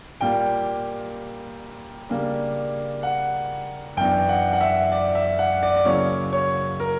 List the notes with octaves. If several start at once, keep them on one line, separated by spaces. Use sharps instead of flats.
A#2 G3 A#3 G5
C#3 G3 A#3 D4
F#5
F#2 E3 B3 D4 G5
F#5
F#5
E5
D5
E5
F#5
D5
D5
C#3 F#3 A#3 C#4 E4 C#5
C#5
A#4